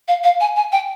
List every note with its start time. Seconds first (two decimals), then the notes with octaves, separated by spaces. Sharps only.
0.08 F5
0.23 F5
0.40 G#5
0.56 G#5
0.72 G5